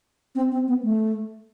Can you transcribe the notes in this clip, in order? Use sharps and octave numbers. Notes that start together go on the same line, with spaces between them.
C4
C4
B3
A3